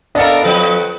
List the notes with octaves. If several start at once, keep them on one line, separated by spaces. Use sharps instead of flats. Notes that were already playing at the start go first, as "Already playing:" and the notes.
B3 D4 A4 A#4 D#5 F5
F2 F3 B4